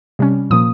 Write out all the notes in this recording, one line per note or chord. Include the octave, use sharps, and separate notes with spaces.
C3 G3 C#4
A#2 F3 A#3 D#6